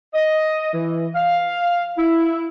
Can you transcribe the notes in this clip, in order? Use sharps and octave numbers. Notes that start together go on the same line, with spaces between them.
D#5
E3
F5
E4